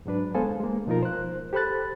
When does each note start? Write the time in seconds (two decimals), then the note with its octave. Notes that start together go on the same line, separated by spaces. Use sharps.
0.06 G#2 F#3 D4 B4
0.35 G#3 B3 A4 C5 F5 G#5
0.60 G#3 A#3
0.87 B2 F3 D#4 F4 A#4
1.02 C5 F#6
1.53 G4 A4 C5 B5 F#6 A6